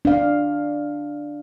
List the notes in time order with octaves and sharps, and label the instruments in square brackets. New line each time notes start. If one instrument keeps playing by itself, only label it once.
[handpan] D4 F5